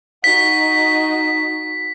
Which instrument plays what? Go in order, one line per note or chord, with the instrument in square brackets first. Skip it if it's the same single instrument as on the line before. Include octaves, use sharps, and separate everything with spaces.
[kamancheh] D#4 F#4 [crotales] B6